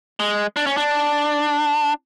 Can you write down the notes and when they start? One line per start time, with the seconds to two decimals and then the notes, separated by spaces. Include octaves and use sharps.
0.20 G#3
0.56 D4
0.66 C#4
0.77 D4